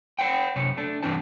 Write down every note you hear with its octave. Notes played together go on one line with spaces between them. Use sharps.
C5 F#5 G5
F#2 C3 C#5
A3 D4
G2 E3 C4 D4 C5 A5